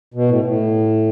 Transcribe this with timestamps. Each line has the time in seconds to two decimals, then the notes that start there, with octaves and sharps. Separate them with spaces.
0.14 B2
0.28 A2
0.44 A2